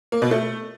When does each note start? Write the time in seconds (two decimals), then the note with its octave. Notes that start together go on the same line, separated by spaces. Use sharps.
0.12 A#3
0.22 B2
0.31 A3